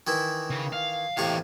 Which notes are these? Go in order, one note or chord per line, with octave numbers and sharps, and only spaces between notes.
D#3 E3 E4
C#3
F5
E2 A2 C3 F5 C#6